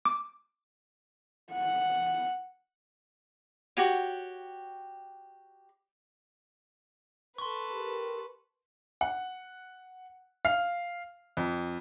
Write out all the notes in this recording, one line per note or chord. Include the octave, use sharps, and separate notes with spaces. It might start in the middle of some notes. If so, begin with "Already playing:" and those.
D6
F#5
F#4 G4 C#5
A4 B4 C6 C#6
G4 A#4
F#5
F5
F2